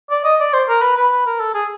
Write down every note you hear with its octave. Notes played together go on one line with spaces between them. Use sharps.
D5
D#5
D5
C5
A#4
B4
B4
B4
A#4
A4
G#4